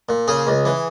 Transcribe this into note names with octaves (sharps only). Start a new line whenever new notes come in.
A#2
C#3 G#4
C#2
E3